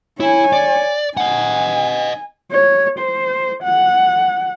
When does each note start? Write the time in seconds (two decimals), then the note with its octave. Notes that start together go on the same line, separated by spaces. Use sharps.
0.20 E4 C#5 G#5
0.53 D5
1.17 D#5 F#5 G#5
2.52 C#5
2.99 C5
3.63 F#5